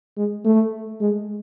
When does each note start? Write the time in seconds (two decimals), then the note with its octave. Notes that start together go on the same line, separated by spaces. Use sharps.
0.17 G#3
0.45 A3
1.01 G#3